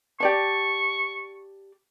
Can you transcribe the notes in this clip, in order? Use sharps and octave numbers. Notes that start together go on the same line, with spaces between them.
G4 D5 A5 C#6